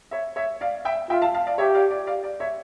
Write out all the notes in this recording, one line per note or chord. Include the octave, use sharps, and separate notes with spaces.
C#5 E5
C#5 E5
D5 F5
E5 G5
F4 E5 G5
F5 A5
F5 A5
D5 F5
G4 C#5 E5
D5 F5
D5
D5 F5
D5
C#5 E5